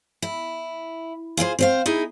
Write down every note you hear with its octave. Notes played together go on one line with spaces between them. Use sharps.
E4
F4 G#4 A#4 C5
C4 C5 F5
D#4 E4 G#4